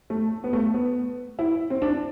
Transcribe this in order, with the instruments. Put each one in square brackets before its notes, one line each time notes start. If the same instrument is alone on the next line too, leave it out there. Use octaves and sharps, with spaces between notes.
[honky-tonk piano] A3
B3
A3
B3
E4
C4
D4